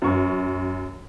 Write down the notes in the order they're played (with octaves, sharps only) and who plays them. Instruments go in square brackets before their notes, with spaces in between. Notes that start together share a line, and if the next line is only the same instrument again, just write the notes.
[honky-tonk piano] F#2 C#6